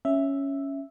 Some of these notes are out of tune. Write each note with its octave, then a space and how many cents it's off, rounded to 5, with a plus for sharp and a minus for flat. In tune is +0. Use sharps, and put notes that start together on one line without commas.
C#4 +0 E5 +0